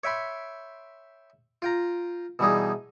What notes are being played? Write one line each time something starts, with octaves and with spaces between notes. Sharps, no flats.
C#5 E5 G5 B5 C6
F4 G5 A#5
B2 E3 G3 D#4 G#4